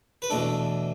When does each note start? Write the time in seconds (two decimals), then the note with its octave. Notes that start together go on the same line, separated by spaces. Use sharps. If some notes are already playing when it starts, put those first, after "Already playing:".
0.22 B4
0.30 E2 B2 A3 D4 A4